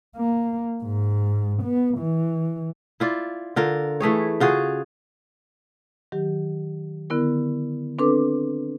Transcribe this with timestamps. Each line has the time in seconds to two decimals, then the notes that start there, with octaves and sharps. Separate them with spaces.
0.17 A#3
0.84 G#2
1.63 B3
1.98 E3
3.00 E4 F4 D5
3.56 D3 F4 A#4
4.00 E3 A3 G#4 C#5
4.40 C#3 F4 F#4 G#4
6.12 D#3 F#3 G4
7.10 D3 B3 E4 A#4
7.99 C4 D4 A4 B4 D6